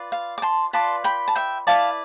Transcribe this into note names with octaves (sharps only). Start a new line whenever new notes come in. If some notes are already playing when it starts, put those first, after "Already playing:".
Already playing: F4 B4 D5
F5
D6
A5 C6
F4 B4 D5 A5 C6
G5 B5
A5
E5 G5
E4 B4 D5 F5 A5